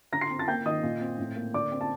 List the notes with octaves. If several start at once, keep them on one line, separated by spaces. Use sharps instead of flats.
D3 A#5 A#6
C6 C7
C4
A5 A6
A#3 G5 G6
D#3 D#5 D#6
A#2
C4
A2
A#3
D3 D5 D6
C4
A5